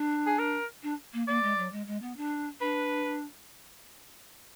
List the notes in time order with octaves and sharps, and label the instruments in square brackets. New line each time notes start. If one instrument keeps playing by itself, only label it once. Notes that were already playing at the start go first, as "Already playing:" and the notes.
Already playing: [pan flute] D4
[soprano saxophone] G#4
A#4
[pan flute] D4
A#3
[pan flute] A#3 [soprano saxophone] D5
[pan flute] G#3
F#3
G#3
G#3
B3
D4
[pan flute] D4 [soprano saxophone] B4